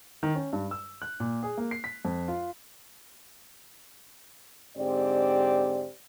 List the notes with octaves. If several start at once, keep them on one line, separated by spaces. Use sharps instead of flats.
D#3
C#4
G2
E6
F#6
A#2
G#4
A#3
C7
B6
F2
F4
G#2 D3 C4 G4 D5